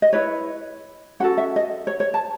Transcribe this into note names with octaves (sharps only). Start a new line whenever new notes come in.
D#5
E4 B4 C#5
C#4 F#4 A4 F#5
E5
D#5
C#5
C#5
A5